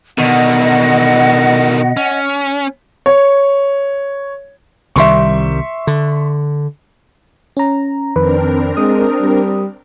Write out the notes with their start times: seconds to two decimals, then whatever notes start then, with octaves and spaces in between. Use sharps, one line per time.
0.18 B2 D3 D#3 D#5 F#5
1.97 C#4
3.06 C#5
4.96 C2 D#3 G3 E5 C6 C#6
5.87 D3
7.57 C#4 A#5
8.16 F2 D#3 C4 D4 A#4 B4
8.77 G#3 D#6
9.20 G3